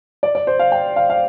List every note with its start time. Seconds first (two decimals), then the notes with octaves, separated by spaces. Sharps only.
0.23 D5
0.35 D5
0.47 C5
0.59 F5
0.72 G5
0.96 F5
1.10 F5